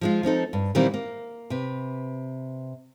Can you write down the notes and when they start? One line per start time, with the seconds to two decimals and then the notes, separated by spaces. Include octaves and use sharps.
0.01 F3 G#3 F4
0.23 F3 C4 D#4 A4
0.53 G2
0.75 A#2 D#3 E3 G3 A#3 C4
0.94 A#3
1.50 C3 B4